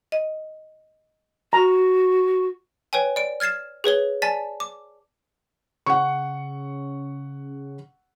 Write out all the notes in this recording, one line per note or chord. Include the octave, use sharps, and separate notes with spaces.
D#5
F#4 A#5
B4 C#5 G5 G#5
D5 D7
F6 G#6 A6 C7 E7
G#4 B4 C#5 G7
D5 G#5 A5 A6 B6
D6
C#3 F#5 C#6